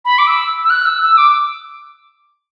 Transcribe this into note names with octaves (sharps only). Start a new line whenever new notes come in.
B5
D6
E6
E6
F#6
E6
E6
D6